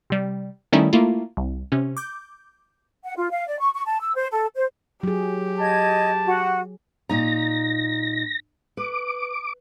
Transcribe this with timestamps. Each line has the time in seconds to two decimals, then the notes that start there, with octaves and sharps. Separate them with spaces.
0.10 C3 G3
0.72 D#3 G3 A3 C#4 D#4 E4
0.93 A3 A#3 E4 F4
1.37 C2
1.72 C3 C#4
1.97 D6 G6
3.04 F#5
3.16 F4
3.31 F5
3.47 D5
3.59 C#6
3.74 C#6
3.86 A5
4.01 E6
4.16 C5
4.32 A4
4.55 C5
5.03 F#3 G4 G#4
5.59 D#5 A5 G#6
6.27 F#4
7.09 A#2 D#4 A#5 A#6
8.77 B4 D6